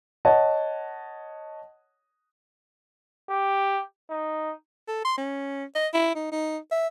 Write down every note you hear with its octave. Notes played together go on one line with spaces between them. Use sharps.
C#5 D#5 F#5 A5
G4
D#4
A4
C6
C#4
D#5
E4
D#4
D#4
E5